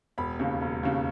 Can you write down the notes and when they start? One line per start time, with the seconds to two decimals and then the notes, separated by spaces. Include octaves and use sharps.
0.18 E1 B5
0.39 D#2 C#3
0.62 E1
0.83 D#2 C#3